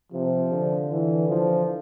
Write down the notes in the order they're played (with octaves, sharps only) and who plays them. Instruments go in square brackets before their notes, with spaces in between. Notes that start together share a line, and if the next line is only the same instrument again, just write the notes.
[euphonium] C3 [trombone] F3
[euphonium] D3
[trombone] E3
F3